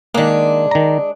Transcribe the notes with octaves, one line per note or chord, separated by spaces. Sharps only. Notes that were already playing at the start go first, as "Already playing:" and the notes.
D#3 G#3 A#3 D4
D#3 A#5